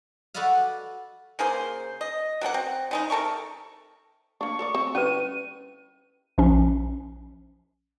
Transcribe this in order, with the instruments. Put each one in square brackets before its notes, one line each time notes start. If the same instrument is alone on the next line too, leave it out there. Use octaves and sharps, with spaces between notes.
[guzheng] F#4 A4 B4 D5 D#5 F5
[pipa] C#3 A#3 G#4 C5
D#5
F#3 A#3 A4 F#5
C4
C#3 G#3 D#4
C3 A4 A#4 C#6
[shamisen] A#3 D4 [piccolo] C#6
[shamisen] A4 A#4 D5
C4 E5
[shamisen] D3 G3 E4 [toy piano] C#4 B4 [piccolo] D#7
[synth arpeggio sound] A#1 C#4